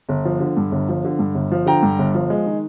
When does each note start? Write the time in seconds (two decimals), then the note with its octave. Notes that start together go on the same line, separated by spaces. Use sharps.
0.09 G1
0.25 F3
0.40 D3
0.57 G2
0.72 G1
0.89 F3
1.04 D3
1.19 G2
1.35 G1
1.52 F3
1.66 D3 G5 A#5
1.83 G2
1.99 G1
2.15 F3
2.30 G#3
2.46 D#3